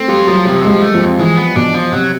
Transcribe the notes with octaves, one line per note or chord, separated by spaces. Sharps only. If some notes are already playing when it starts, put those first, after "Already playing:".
Already playing: A3 C4
G3 F4
F3 F#3
C3 G3
F3 G#3
G3
A3
F3
F2
E3 G#3
B3
B2 D4
F3
C3 F#3